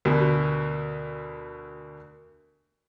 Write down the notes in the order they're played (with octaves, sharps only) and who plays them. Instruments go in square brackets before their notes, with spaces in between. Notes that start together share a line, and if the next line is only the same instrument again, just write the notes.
[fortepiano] D2 B2 [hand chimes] A#4